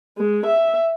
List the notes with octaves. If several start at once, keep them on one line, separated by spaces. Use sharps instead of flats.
G#3
E5